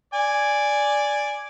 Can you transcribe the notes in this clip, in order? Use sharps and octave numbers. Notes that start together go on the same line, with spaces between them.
D5 G#5